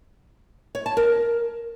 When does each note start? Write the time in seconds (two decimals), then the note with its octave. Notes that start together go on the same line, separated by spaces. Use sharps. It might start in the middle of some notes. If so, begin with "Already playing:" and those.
0.75 C#5
0.86 A5
0.97 A#4